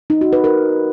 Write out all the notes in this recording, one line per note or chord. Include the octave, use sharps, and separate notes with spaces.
D#4
F#4
B4
A#4